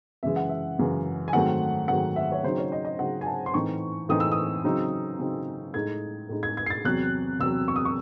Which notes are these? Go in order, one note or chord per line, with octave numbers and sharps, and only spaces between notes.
F#2 C#3 E3 G#3 E5
F#5
E5
F#2 C#3 E3 G#3
G#5
G#2 D#3 F#3 A3 C4 F#5
G#2 D#3 F#3 A3 C4 F#5
E5
C#5
C#3 F#3 C4 D#4 C5
C#5
D#5
D#5
C#3 F#3 C4 D#4 F#5
G#5
A5
C6
A2 E3 C4 D#4 C#6
A2 E3 C4 D#4 D#6
E6
D#6
C#3 F#3 C4 D#4
C#3 F#3 C4 D#4
A2 G#3 D#4 G#6
A2 G#3 D#4
G#6
G#6
C7
A6
E2 C3 F#3 F#6
E2 C3 F#3 E6
C#6
D#6
C#6